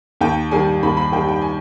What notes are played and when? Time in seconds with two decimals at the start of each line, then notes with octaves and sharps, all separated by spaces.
0.21 D#2 G5
0.51 D#3 G3 G#5
0.83 D#2 B5
0.97 B5
1.12 D#3 G3 G5
1.28 G5
1.42 G#5